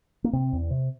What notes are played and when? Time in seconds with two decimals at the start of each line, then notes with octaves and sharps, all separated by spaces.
0.24 A#3
0.33 C3 C4
0.53 E2
0.71 C3